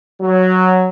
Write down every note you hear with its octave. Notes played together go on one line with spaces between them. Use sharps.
F#3